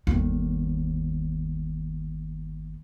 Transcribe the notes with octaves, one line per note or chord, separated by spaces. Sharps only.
G1 D#2